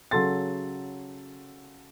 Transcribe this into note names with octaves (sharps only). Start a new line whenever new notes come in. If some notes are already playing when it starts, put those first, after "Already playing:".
C#3 F#3 F#4 A4 C6 A6